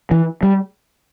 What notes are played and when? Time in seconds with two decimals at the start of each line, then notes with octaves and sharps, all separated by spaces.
0.11 E3
0.43 G3